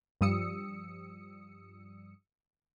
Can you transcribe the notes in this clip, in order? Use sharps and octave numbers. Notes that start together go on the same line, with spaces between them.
G2 F3 G3 D#6 E6 C#7